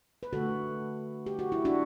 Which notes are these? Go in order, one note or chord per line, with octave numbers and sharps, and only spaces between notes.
B4
D3 A3 F#4 A4
G4
F#4
E4
D4 F#4